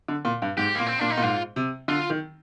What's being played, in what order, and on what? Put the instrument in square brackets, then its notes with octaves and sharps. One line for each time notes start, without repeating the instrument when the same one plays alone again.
[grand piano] D3
A#2
G2
[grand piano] G#2 [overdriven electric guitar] G4
[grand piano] A#2 [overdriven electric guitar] A#3
[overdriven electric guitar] C4
[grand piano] A#2 [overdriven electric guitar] D4
[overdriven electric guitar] D#4
[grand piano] A#2
[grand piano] G#2 [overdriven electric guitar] F4
[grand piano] C3
[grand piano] D3 [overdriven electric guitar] F4
[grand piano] D#3